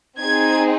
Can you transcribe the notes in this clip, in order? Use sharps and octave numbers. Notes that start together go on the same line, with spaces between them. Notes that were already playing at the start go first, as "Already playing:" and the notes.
C4 D#4 G#4 G#6